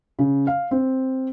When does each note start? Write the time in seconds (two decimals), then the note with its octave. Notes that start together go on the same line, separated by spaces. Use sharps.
0.19 C#3
0.47 F5
0.71 C4